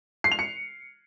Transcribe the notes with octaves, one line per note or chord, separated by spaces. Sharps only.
C7
F7
C#7